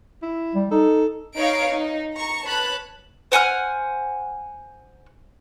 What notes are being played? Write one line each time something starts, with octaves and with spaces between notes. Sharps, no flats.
E4
G3
D#4 A4
D#4 B4 C#5 F5 D7
D#4
A#5 C#6
B4 C#5 A5 B5 F#6
C5 F#5 G#5 F6